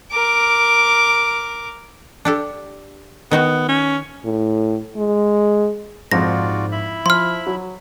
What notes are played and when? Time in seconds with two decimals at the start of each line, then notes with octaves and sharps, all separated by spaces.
0.12 A#4 D6
2.25 D4 G4 A4
3.31 D#3 B3 D#4 F#4
3.69 C#4
4.25 A2
4.97 G#3
6.11 A#1 F2 G#2 C4 F4 F#4 D5 A#6
6.72 E4 E5 B5
7.06 F3 C6 F6
7.47 F#3